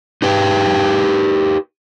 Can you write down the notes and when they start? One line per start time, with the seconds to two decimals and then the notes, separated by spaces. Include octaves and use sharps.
0.22 D#4 G4 B4 G5